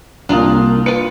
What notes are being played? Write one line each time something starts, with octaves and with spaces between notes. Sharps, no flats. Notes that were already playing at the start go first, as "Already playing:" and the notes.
C2 A#3 D4 F4 A#5 D#6
F4 B4 C#7